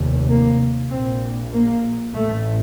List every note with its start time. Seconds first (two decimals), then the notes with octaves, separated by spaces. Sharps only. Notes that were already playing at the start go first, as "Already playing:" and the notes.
Already playing: F1 D#2
0.28 A#3
0.90 A#1 A#2 C4
1.53 A#3
2.15 A1 A2 A3